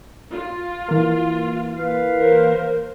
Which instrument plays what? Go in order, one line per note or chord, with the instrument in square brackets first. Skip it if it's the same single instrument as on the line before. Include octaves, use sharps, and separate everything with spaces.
[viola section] F4
[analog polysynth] E3 A#3
[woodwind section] B4 F5
[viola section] A#4 C5